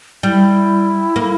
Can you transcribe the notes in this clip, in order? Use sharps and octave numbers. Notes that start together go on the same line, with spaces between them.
G3 E4
A#3